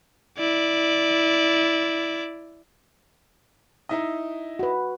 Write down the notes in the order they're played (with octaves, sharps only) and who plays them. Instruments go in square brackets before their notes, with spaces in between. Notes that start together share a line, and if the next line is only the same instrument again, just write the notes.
[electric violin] E4 D5
[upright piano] D#4 E4 D#5
[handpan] F#4 B4